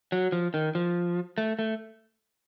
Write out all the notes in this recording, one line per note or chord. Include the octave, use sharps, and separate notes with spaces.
F#3
F3
D#3
F3
A3
A3